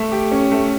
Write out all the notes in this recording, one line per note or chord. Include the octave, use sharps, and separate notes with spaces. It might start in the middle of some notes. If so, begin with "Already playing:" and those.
Already playing: A3
G4
C#4
A3